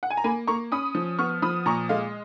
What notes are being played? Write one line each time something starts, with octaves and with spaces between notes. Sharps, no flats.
F#5
G#5
A#5
A#3 G#5 B5
A#3 A#5 C#6
C#4 B5 D#6
F3
B3 C#6 F6
F3 B5 D#6
A#2 A#5 C#6
G#3 F5